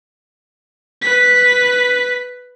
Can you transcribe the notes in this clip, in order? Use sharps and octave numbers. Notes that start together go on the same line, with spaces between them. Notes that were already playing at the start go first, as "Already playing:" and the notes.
B4 B6